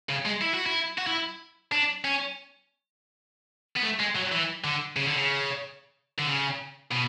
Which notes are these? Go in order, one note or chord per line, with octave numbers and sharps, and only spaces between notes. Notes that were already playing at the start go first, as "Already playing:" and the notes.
C#3
G#3
E4
F#4
E4
F#4
E4
D4
C#4
B3
A3
G#3
F#3
E3
D3
C#3
D3
C#3
D3
C#3
B2